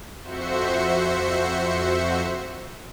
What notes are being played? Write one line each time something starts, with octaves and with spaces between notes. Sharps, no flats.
F2 F#4 C5 E5 C#7